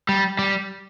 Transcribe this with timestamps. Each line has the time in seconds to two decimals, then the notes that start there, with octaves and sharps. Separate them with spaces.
0.09 G3
0.39 G3